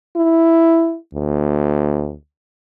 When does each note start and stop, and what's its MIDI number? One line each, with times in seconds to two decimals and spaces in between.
0.16 0.97 64
1.14 2.14 38